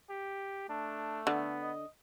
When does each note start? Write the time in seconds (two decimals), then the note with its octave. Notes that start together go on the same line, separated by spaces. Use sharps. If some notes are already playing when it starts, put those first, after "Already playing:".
0.10 G4
0.69 A3 D4
1.27 D3 B3
1.62 D#5